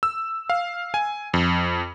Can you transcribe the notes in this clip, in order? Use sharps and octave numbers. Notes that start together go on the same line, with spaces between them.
E6
F5
G#5
F2